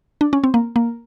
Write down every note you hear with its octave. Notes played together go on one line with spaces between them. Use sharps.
D4
C#4
C4
A#3
A#3